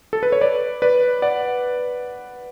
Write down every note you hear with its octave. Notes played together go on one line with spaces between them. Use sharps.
A4
B4
C#5
B4 D5
B4 D5
D5 F#5